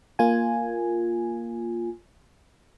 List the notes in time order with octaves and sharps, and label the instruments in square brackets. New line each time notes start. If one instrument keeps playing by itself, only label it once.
[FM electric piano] A#3 F4 G#5